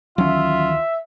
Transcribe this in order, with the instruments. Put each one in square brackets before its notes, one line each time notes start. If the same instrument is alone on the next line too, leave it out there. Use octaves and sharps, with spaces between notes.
[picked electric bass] D2 D#3 E3 [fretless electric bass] F#3 C#4 [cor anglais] F4 [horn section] E5